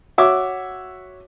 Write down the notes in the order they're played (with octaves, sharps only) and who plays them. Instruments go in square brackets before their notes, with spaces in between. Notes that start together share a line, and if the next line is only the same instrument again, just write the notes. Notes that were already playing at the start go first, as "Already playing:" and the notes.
[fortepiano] F#4 C#5 E5 D6 E6